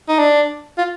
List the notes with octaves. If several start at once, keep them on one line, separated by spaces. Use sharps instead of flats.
D#4
D4
F4